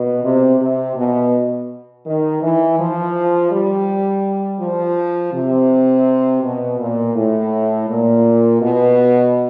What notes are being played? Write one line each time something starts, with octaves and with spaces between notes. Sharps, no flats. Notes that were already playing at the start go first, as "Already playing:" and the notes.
Already playing: B2
C3
C3
B2
D#3
E3
F3
G3
F3
C3
B2
A#2
A2
A#2
B2